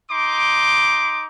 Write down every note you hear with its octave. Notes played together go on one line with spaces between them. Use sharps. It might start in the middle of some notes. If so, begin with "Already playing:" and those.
D#4 C6 D6